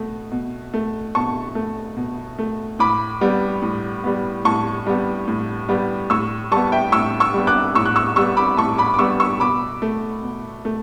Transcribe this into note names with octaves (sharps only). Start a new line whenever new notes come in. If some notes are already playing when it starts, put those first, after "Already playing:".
Already playing: B2 A3
B2
A3
B2 A5 C#6
A3
B2
A3
A2 B5 D6
G3 B3
A2
G3 B3
A2 A5 C#6
G3 B3
A2
G3 B3
A2 C#6 E6
G3 B3 A5 C#6
E5 G5
A2 C#6 E6
C#6 E6
G3 B3
D6 F#6
A2 C#6 E6
F#6
C#6 E6
G3 B3 C#6 E6
B5 D6
A2 A5 C#6
B5 D6
D6
G3 B3 C#6 E6
C#6 E6
B2 B5 D6
A3
B2
A3